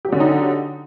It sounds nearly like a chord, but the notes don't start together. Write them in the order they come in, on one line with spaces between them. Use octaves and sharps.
G4 F#3 D3 C#4 D#4